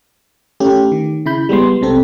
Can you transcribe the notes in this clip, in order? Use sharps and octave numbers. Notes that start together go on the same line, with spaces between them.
A3 C#4 G4
D#3
C#3 E4 B5 G6
G3 G#3 B3 C6
B1 C3 C4 A4